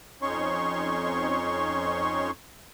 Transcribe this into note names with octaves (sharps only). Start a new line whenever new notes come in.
F2 C#4 D#4 C#5 C6 C#6